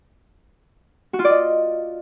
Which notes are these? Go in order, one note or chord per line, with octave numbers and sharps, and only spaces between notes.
F#4
F4
D5
D#5